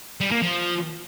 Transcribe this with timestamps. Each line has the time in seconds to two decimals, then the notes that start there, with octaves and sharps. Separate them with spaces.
0.21 G3
0.31 A#3
0.42 F3